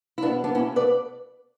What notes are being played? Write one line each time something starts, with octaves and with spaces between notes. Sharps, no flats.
E4
B2 B3 D4
B2 B3 D4
C#4 E4
B2
B4 D5